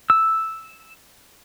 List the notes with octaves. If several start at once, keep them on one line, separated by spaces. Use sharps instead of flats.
E6